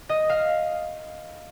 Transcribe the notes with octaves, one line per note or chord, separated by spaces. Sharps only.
D#5
F5